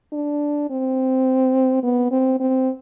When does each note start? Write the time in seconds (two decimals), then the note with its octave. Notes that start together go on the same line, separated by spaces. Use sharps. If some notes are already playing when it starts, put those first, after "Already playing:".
0.13 D4
0.70 C4
1.84 B3
2.11 C4
2.40 C4